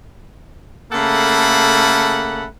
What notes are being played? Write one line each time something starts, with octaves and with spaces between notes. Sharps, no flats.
C#3 A3 A#3 A4 F#5 B5